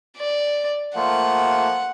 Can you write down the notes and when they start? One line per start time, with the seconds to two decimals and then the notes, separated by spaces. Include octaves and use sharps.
0.18 D5
0.95 F3 A3 A#3 F#5